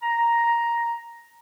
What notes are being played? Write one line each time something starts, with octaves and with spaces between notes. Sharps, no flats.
A#5